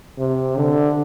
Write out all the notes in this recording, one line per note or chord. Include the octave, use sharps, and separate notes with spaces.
C3
D3